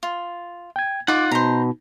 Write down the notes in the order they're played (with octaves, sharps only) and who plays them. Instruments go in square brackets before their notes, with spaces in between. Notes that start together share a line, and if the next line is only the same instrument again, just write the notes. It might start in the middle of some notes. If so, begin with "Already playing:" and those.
[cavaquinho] F4
[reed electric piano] G5 G#6
[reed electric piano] D#4 [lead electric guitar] F4 F#5 [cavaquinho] D6
[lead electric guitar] B2 [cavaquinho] C5 A#5